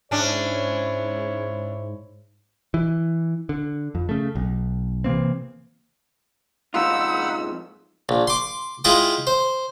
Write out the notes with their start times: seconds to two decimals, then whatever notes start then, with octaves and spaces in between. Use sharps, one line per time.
0.11 G#2 C#4 D4 E4 C5 C#5
2.74 E3
3.49 D3
3.95 F2
4.09 C#3 A3
4.35 B1
5.04 C3 E3 A#3 C4
6.74 F2 G#2 D#4 F4 F#5 B5 E6
8.09 A#1
8.27 C6 D6
8.84 G#3 E4 F4 G5 D#6
9.27 C5